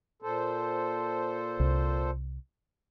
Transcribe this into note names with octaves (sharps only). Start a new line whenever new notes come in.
A#2 A4 C5
C2